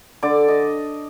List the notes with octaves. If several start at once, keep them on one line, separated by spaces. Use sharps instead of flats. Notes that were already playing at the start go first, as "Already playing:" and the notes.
D3 D5
D#5